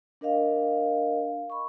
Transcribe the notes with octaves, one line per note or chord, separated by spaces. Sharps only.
D4 A#4 D#5 F5
B5 C#6